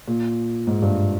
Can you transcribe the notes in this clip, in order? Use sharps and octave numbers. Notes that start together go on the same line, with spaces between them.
A#2
G#2
G2